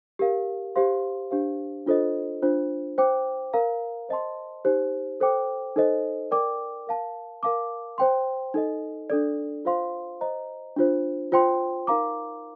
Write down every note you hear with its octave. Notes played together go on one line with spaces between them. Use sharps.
G4 A#4 F5
G4 C5 F5 C6
D4 G4 C5 F5
D4 F4 A4 C5 D#5
D4 F4 C5
C5 G5 D6
A#4 F5 A#5
C5 D#5 A5 C6
D#4 G4 C5
A4 C5 G5 D6
D#4 A4 C5 D#5
A#4 D5 G5 D6
A#4 F5 A5
A#4 F5 A5 D6
C5 G5 C6
D#4 A4 D#5
D4 A4 D5
F4 C5 F5 C6
C5 D#5 A#5
D4 F4 C5
F4 C5 G5 C6
D#4 A#4 F5 A#5 D6